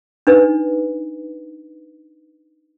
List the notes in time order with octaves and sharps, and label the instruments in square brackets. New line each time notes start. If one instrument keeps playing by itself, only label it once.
[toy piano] D4 D#4 B4